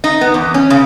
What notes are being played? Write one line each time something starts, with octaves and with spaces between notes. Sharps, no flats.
D#4
B3
E2
C#4
C#3